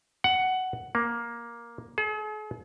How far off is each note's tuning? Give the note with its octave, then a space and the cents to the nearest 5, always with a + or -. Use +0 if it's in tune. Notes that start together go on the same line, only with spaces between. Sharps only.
F#5 +10
A#3 +10
G#4 +45